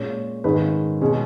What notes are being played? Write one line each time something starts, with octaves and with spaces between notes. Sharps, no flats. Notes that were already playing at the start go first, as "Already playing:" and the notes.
Already playing: A#2 G#3 C#4 C#5
G#2 D#3 G#3 C#4 B4
B2 G#3 C#4